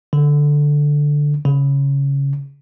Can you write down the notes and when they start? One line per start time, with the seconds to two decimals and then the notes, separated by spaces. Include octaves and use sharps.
0.13 D3
1.45 C#3